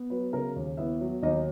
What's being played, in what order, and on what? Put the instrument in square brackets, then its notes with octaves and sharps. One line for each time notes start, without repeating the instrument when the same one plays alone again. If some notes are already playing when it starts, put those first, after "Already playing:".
Already playing: [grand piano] B3
F#3 B4
C#3 A#4
D#2
B3 E4 E5
F#3
D#2 D#4 D#5